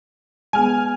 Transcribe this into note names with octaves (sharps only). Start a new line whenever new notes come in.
G#3 B3 G#5 F6